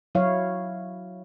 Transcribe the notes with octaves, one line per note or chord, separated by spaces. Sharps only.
F#3 E4 C#5 F5